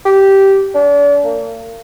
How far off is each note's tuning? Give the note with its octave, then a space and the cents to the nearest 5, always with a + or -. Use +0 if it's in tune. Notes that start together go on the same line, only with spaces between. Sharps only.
G4 -10
D4 -40
A#3 -35